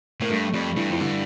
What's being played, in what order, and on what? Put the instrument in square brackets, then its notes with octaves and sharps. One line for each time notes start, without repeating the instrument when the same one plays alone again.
[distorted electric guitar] A2 [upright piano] A#3
[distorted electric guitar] G2 [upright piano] A3
[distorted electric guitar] F2 [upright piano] G3
[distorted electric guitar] G2 [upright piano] E3
[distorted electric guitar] F2 [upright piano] E3
[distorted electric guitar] G2 [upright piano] D3